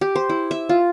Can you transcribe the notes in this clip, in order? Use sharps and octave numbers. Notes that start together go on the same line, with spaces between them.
G4
C5
E4
E5
F4